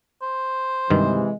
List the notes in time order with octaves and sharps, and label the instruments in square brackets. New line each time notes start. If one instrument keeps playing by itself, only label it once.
[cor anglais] C5
[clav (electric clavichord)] G2 D#3 [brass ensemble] C3 E3 G#3